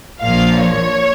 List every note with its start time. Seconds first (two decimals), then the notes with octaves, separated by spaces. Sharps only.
0.22 A#1 A#2 F3 F5
0.61 C#5